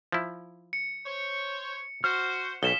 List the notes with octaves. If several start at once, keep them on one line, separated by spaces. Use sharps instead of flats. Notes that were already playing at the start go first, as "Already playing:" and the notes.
F3 E4
C#7
C5 C#5
F#4 C5 F6
B1 C#3 B6 E7 G7